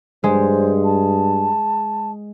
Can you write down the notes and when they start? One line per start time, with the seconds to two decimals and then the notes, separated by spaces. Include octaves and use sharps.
0.24 G2 G#3 C5
0.84 A5